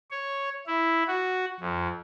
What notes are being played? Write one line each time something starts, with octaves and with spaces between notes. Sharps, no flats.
C#5
E4
F#4
F2